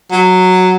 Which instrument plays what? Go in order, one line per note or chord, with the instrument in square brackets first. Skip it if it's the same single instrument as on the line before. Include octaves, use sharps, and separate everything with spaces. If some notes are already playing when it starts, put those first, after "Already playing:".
[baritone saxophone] F#3